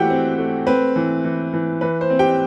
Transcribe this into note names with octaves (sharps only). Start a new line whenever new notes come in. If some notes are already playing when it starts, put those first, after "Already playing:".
Already playing: E3 A3 E4 F#4 G4 F#5 G5
C4
A3
C4 B4
E3
E3
E3
E3 B4
C5
C4
G4 G5